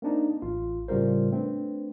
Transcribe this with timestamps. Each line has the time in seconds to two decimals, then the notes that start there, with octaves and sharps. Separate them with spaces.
0.02 A#3 C4 D4 D#4
0.42 A1 F4
0.88 A2 C#3 G3 F4 A#4 C5
1.31 A3 C4 D4 B4